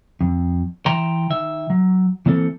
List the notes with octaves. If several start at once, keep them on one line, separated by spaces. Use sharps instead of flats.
F2
E3 E5 G5 A#5 C6
D#3 E5
F#3
E3 A#3 C4 A4